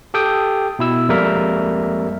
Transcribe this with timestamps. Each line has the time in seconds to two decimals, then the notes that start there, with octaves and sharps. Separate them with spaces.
0.14 G4 A4 G5 D#6
0.79 B2 E4 E6
1.09 F2 G3 G#3 A#3 A#4 E5